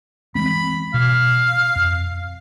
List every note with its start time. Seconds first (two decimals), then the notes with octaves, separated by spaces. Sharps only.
0.35 E3 G#3 C4 B5
0.94 B2 F5
1.76 F2